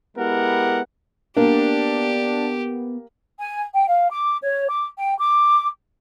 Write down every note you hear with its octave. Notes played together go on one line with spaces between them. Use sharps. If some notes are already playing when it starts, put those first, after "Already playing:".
G#3 B3 E4 G4 A#4 F#5
A#3 B3 D4 G4
G#5
G5
F5
D6
C#5
D6
G5
D6